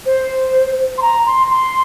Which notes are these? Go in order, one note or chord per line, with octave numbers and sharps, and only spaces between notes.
C5
C6
A#5
C6
C6